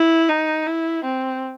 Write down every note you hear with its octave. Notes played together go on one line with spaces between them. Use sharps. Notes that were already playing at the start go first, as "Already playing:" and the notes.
Already playing: E4
D#4
E4
C4